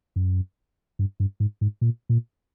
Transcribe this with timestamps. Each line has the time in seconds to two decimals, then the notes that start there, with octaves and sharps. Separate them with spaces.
0.16 F#2
0.99 G2
1.20 G2
1.40 G#2
1.61 G#2
1.81 A#2
2.09 A#2